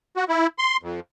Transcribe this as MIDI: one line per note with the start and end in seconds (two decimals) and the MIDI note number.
0.16 0.24 66
0.28 0.47 64
0.58 0.77 84
0.83 1.00 41